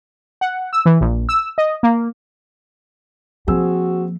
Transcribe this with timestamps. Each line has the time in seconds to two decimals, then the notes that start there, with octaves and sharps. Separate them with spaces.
0.41 F#5
0.73 E6
0.86 E3
1.01 A#1
1.29 E6
1.58 D#5
1.83 A#3
3.48 F3 A#3 C4 F#4 G#4 E6